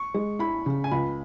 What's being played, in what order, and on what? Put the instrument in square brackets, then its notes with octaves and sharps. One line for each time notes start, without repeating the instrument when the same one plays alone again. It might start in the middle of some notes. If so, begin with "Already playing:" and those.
Already playing: [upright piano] C#6
[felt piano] G#3
[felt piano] E4 [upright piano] B5
[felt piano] C#3
[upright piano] G#5
[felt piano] C#2 [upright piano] B5